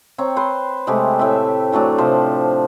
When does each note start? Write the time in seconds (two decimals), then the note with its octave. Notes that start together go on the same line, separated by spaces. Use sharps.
0.18 C4 C#5 A#5
0.36 B4 C5 C6
0.87 C3 G#3 A3 G4
1.19 A2 C4 E5
1.72 E3 F#3 A3 D4
1.98 C3 F3 C5